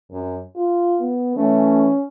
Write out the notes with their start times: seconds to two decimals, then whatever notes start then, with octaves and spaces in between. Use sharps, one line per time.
0.11 F#2
0.56 F4
1.00 B3
1.36 E3 A3 C#4